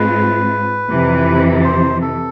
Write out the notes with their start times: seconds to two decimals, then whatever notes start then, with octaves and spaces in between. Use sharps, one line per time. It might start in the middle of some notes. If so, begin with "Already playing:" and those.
Already playing: G#2 G#3 C4 F4 B4
0.89 F2 C3 E3
1.64 C5
2.02 A4